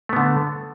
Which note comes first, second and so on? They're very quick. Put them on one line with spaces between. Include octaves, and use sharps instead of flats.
A3 B3 D3